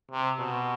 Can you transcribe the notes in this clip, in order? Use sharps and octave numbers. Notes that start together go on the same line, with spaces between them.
C3
B2